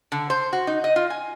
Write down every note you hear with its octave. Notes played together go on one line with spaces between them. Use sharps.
D3
C5
F#4
D#4
D#5
F4
G#5